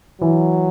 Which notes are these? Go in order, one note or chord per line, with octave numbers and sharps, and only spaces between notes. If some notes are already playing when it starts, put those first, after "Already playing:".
E3 F#3